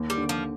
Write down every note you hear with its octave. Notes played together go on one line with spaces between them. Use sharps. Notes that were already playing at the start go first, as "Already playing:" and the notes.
Already playing: D#2
G3
D3
F3